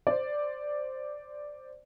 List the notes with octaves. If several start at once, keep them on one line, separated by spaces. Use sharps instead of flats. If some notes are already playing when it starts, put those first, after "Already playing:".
C5 D5